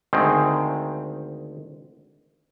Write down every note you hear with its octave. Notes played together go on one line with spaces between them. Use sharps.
D2 D#3 G#3 C4